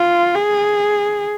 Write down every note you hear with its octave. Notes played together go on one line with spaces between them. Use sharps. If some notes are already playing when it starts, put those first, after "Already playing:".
Already playing: F4
G#4